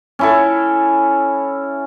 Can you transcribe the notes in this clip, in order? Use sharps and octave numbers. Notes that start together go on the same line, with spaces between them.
C#4 E4 A4